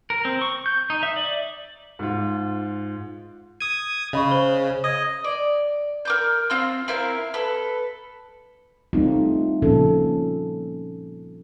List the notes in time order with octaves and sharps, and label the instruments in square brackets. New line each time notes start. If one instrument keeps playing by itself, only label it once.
[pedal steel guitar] A#4
C4
C#6
G6
D#4
E5
D5
[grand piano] G#2 F4
[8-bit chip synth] D#6 G#6 [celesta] D#7
[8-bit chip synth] C#3 [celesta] D#5 B5 C#6
[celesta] C5 G7
[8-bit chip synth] D#5 [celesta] D#6 G#6
[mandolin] D5
A#4 D6 G6
C4 F4 C6
C4 E4 A#4 F5
A4 B4
[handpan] G3 A3 C4 D#4 F4
A#2 C#3 F3 C#4 A4